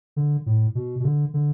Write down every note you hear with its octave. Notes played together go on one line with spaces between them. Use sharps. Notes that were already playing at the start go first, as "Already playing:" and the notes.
D3
A2
B2
B2
D3
D3